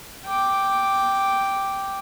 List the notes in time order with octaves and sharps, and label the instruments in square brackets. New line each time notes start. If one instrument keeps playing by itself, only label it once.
[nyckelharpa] G5 D6